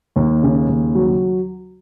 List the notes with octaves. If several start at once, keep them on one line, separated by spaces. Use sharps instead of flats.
D#2
C#3
D#2
F#3